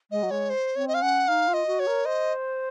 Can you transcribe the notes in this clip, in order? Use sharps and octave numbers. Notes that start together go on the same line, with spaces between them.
G#3 D#5
F#3
G#3 C#5
C5
C4 C#5
D#5
F5
C#4 F#5
D#4 F5
F4
D#5
F#4
C#5
A#4
C5 D#5